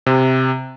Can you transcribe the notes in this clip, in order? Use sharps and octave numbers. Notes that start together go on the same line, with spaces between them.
C3